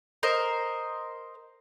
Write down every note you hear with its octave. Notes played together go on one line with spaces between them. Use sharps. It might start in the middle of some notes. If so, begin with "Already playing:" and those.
A#4 C5 D#5